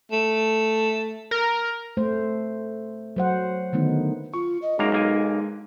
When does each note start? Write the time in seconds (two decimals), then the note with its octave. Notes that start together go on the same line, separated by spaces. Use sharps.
0.12 A3
1.31 A#4
1.97 A3 C5
3.16 F#3 C5 F#5
3.73 D3 D#3 A3 B3 D#4
4.34 F4 C#6
4.62 D#5
4.79 F#2 G#3 A#3 D#4 A#5
4.92 B1 A#3 G#5